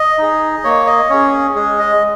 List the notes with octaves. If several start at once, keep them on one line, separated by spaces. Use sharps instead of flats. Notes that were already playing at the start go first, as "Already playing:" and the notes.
Already playing: D#5
D#4 G#4
A#3 C#5
D#5
C#4 G#4 C#5
G#3 G#4
D#5